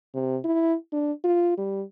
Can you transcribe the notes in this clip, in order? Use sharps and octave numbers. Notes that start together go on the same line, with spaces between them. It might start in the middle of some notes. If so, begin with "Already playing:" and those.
C3
E4
D4
F4
G3